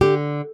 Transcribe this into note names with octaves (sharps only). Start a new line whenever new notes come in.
D3 G4